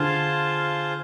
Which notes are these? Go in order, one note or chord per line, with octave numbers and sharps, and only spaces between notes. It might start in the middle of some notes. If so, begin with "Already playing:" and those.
Already playing: D3 F4 G#4 C5 F5 A5